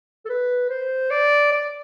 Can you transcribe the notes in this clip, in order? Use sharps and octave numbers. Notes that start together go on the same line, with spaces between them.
A4
B4
C5
D5
D5